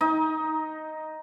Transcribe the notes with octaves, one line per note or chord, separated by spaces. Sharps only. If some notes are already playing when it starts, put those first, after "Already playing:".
D#4